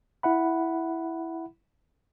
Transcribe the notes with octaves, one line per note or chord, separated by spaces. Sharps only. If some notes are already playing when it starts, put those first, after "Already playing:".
E4 E5 F#5 B5